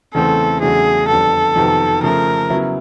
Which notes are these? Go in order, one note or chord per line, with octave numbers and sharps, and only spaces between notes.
E2 C#3 E3 A3 C4 A4
E2 C#3 F#3 A3 D4 G#4
F2 D3 G3 B3 A4
F2 C3 D#3 F#3 B3
C#3 F3 A3 A#4
C#3 F#3 B3 E4